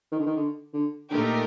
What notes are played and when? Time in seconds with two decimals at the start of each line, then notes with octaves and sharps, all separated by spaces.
0.12 D#3
0.19 D3
0.26 D#3
0.36 D3
0.74 D3
1.11 A#2 D3 A3 D#4 G4 A#4